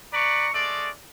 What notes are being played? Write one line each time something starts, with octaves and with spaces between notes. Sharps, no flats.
B4 D5 A#5 C#6
G#3 A3 D5